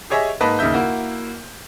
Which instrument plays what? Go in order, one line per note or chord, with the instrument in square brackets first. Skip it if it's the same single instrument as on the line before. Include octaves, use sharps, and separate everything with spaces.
[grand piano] G4 G#4 C#5 D#5 E5 G#5
G#2 A#3 B4 D#5 A5 B5
D#2 C#3 D#4 D#5 E5 G6
A#3 E4 F#4